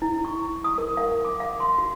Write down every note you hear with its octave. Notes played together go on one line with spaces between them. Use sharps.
E4
C#6
D#6
A#4
F5
D6
F5
C6
F#4